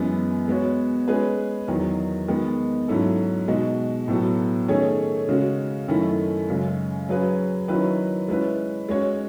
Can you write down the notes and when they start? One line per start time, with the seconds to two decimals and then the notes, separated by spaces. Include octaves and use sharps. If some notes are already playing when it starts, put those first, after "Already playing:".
Already playing: F#2 E3 G#3 B3
0.48 G#3 B3 F#4 C#5
1.08 G#3 C#4 G#4 B4
1.68 E2 D#3 F#3
2.28 D#3 G#3 B3
2.88 G#2 F#3 C#4 E4 A4
3.48 B2 G#3 D#4 F#4
4.08 A2 F#3 B3 F#4 A4
4.68 D#3 A3 C#4 G#4 C#5
5.29 C#3 G#3 C#4 F#4
5.88 F#2 D#3 A3 C#4 E4
6.48 F#2 C#3 G#3
7.09 F#3 C#4 G#4 B4
7.68 D#3 F#3 C#4 E4 B4
8.28 G#3 C#4 E4 B4
8.89 G#3 C#4 F#4 C#5